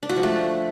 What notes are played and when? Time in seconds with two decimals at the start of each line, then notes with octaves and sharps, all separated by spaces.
0.03 D4
0.09 F#4
0.16 F3
0.23 A3